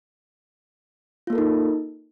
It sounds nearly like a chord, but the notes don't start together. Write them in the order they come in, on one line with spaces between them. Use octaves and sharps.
F4 A#3 A4 A#4 D#4